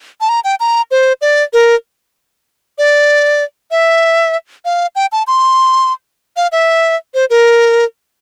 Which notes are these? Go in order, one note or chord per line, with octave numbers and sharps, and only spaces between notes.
A5
A#5
G5
A#5
C5
D5
A#4
D5
E5
F5
G5
A5
C6
F5
E5
C5
A#4